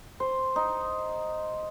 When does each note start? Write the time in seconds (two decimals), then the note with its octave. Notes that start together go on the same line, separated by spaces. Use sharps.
0.20 C5
0.56 D#4